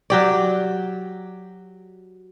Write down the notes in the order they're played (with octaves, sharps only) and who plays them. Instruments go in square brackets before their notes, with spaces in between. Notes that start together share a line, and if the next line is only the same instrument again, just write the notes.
[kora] F#3 G4 D5